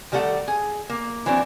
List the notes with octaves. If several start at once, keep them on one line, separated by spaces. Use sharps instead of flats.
D#3 G3 A3 A4 F#5
G#4
A#3
E3 F#3 B3 C4 D4